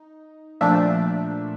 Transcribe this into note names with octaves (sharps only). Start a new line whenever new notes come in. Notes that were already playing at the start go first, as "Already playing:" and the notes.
Already playing: D#4
A#2 F3 A3 D4 E5